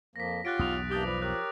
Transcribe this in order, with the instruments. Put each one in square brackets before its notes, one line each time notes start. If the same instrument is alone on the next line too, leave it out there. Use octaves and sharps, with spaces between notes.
[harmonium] F2 F3 A#3 [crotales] A#6 B6
[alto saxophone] F4 [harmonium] G4 C#5 F#5 [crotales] F#6 A6 D7
[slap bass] B1 E2 [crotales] D#6 F7
[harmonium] E3 A#3 D4 [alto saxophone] G4 [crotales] D6 D#6 A6
[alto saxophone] F3 [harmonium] B4 D5
[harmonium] G4 A#4 C#5 [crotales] F#6